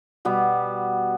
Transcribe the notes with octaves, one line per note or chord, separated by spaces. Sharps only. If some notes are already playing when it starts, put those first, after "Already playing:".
B2 G3 B3